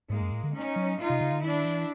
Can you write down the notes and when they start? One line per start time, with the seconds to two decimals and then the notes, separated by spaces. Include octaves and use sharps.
0.10 G#2 G#3 A#3
0.21 F#2
0.32 A2
0.44 D3
0.54 C#4 D#4
0.76 F#3
0.99 D#4 F4
1.10 C3
1.21 C#3
1.32 D3
1.43 D#3 D4 E4
1.65 E3